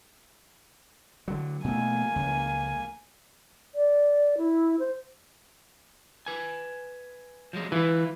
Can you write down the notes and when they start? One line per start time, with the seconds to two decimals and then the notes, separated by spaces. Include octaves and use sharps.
1.28 D3 F#3
1.64 B2 A3 A#3 G#5
2.16 C#2
3.75 D5
4.38 E4
4.79 C5
6.26 B4 G#5
7.53 F3 F#3 G#3
7.72 E3 F4 B4